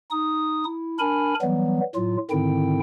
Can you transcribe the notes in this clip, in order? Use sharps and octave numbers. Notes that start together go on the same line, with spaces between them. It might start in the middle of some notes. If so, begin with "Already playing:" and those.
D#4 D#6
E4
D4 A#4 G#5 B5
E3 F#3 G3 B3
A2 F#3 F4
G#2 D3 D#3 C4 E4 G5